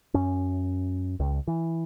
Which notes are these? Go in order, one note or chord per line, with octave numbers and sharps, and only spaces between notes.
F#2 C#4
C#2
E3